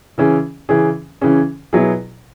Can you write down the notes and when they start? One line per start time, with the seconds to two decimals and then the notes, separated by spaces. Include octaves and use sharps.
0.18 C#3 E3 C#4 G#4
0.69 C#3 E3 C#4 G#4
1.21 C#3 E3 C#4 G#4
1.73 B2 F#3 B3 E4 G#4